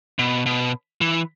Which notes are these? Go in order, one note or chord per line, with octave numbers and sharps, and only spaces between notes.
B2
B2
E3